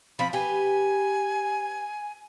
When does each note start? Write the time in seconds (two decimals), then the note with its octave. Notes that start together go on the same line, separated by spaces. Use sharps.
0.19 F3 C4 B5
0.33 G4 B4 G#5